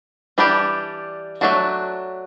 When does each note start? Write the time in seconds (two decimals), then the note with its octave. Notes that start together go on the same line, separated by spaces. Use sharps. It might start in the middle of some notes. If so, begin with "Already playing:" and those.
0.38 E3 G3 D4 G4
1.41 F#3 A3 D4 F#4